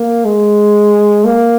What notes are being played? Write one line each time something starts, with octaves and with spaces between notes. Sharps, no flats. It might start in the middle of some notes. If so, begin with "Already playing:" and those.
Already playing: A#3
G#3
A#3